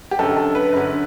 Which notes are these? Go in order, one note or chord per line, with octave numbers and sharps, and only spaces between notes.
G4
F#2 D3 A4
A4
B4
F#2 D3